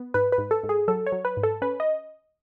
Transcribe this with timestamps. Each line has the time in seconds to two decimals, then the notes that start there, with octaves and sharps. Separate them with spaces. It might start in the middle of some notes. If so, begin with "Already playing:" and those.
Already playing: B3
0.14 G#2 B4
0.32 B4
0.38 G#2
0.51 A4
0.63 G#2
0.69 G#4
0.88 F#3 A4
1.06 C#5
1.12 F#3
1.25 B4
1.37 G#2
1.43 A4
1.62 C#4 B4
1.80 D#5